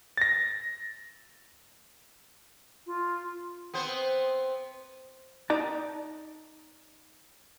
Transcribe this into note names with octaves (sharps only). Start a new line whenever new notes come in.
A6 A#6
F4
B3 C4 C5
D#4 D5 A5